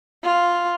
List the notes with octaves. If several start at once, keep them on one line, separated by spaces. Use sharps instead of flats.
F4